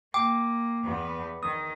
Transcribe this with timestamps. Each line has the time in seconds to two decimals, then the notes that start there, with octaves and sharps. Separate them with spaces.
0.14 A#3 G5 D6
0.84 E2 B3
1.43 D#3 D#6